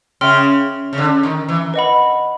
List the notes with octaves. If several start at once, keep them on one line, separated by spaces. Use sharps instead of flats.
C#3 E5 G5 C6 F6
C#3
D3
D#3
E3
B4 D#5 F#5 B5